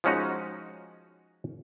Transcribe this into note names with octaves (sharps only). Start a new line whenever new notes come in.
F3 G#3 C#4 D#4 F#4